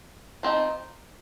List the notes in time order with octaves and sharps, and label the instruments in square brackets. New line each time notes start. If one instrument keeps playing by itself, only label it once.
[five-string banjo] F3 C4 D#4